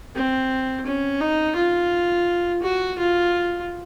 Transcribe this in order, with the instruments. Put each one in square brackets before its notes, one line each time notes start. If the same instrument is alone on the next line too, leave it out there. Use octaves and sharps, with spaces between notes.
[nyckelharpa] C4
C#4
D#4
F4
F#4
F4